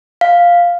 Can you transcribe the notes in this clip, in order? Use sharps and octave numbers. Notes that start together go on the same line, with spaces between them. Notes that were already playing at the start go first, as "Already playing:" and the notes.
F5